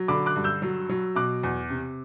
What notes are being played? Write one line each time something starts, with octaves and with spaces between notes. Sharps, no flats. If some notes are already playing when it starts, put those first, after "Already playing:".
Already playing: F#3
D3 B5 D6
D6 F#6
G2
E6 G6
F#3
F#3
B2 D6 F#6
E2
C3